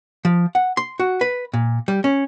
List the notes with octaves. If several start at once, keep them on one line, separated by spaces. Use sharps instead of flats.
F3
F#5
C6
F#4
B4
A#2
G3
C#4